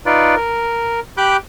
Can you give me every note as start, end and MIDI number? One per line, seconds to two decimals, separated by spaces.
0.06 0.35 63
0.06 0.35 65
0.06 0.35 71
0.06 0.35 74
0.36 1.00 70
1.17 1.37 67
1.17 1.37 83
1.17 1.37 86
1.17 1.37 90
1.17 1.37 91